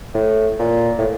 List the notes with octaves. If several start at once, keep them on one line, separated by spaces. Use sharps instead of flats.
A2
A#2
A2